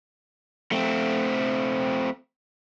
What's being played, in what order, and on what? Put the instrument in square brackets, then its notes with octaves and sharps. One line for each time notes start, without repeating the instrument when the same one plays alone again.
[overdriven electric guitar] A3 C4